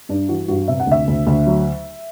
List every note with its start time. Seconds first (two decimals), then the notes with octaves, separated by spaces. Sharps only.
0.09 G2 D4
0.29 E3 F#4
0.48 G2 F#4
0.68 C3 E5
0.80 F#5
0.87 D2 E5
1.08 D2
1.27 D2
1.47 F#3